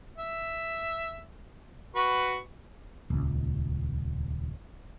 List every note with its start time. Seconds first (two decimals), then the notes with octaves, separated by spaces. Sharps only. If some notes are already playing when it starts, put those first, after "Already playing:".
0.18 E5
1.96 F#4 B4 C#6
3.10 D#1 C#2